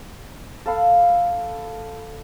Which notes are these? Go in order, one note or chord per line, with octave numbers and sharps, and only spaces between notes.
A4 F5 F#5 B5